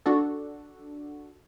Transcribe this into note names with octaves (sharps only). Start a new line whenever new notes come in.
D4 F#4 A4